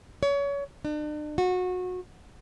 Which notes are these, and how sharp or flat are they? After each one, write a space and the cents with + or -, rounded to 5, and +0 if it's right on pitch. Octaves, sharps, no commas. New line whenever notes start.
C#5 +30
D4 +40
F#4 -25